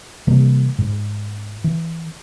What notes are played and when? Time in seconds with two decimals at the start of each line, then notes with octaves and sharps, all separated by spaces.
0.27 C3 E3 G3 A#3
0.78 G#2
1.64 E3